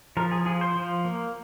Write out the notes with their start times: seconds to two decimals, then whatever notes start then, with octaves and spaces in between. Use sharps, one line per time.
0.17 F3 A#4
0.31 G#4
0.46 F3 G#4
0.61 C5
0.76 F3
1.05 A#3